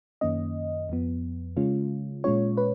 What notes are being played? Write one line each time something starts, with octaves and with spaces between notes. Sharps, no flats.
F#2 D#3 A#3 C#4 D#5
F2 F3 B3
C#3 G#3 C#4 F4
A#2 G#3 C#4 F4 C#5
B4